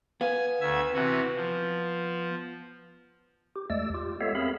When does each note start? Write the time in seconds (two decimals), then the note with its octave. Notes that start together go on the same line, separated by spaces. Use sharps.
0.21 B3 F5 G#5
0.61 D2 E5 G#6
0.94 C3 E3 F#4
1.36 F3
3.56 G4
3.70 E2 G#3 A3 D5 E6
3.94 F4 G4
4.21 G#3 B3 A4 C#5 E5 F5
4.35 C4 G#4 A#4 E5 F5 B5